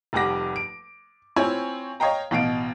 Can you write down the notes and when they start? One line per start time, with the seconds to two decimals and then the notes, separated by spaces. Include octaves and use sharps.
0.13 F1 F2 G3 F#5 D6 A#6
0.56 D7
1.36 C4 E4 F4 C#5 G#5
2.00 C#5 D#5 F5 G5 A#5
2.31 A1 B2 F5 D7